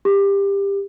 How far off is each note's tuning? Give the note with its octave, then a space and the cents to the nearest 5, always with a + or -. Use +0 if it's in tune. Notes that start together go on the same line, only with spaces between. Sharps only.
G4 +20